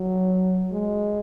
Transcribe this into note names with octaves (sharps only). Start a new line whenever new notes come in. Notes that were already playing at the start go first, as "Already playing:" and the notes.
Already playing: F#3
G#3